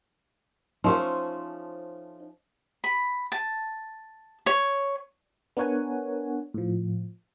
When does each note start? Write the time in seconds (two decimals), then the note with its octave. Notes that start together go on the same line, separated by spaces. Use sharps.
0.84 F3 A3 C#4 D#4 C5
2.84 B5
3.32 A5
4.46 C#5
5.57 B3 D4 A#4 C#5 F#5 G#5
6.54 A2 F3